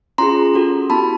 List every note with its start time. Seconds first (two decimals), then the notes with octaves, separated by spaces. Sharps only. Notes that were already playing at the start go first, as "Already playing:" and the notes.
0.18 C#4 F4 G#4 A#5 C6
0.54 C#4 F#4 A4
0.90 B3 E4 G4 A5 B5